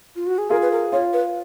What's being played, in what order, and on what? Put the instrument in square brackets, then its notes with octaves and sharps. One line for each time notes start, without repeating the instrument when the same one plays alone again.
[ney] F4
F#4
G#4
[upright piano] F4 G#4 [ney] A#4
[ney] B4
A#4
[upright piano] F4 [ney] C#5
[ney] B4